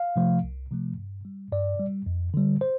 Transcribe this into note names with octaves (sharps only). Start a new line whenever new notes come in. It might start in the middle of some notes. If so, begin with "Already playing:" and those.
Already playing: F5
C3 F3 A3
C2
C3 F3 A3
G2
G3
G2 D5
G3
F2
D3 G3
C5